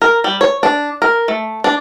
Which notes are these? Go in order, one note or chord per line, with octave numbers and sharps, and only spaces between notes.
A#4
G3
C#5
D4
A#4
A3
D4